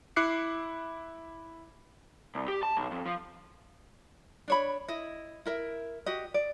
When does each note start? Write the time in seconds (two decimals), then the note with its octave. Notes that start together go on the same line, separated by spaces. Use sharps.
0.16 E4 D6 F#6 C7 C#7
2.35 C2
2.48 G4
2.63 A5
2.77 B1
2.91 F2
3.06 F3
4.48 D4 C#5 B5
4.88 E4 D#5
5.45 E4 A#4 E5
6.06 F#4 G4 D#5
6.34 D5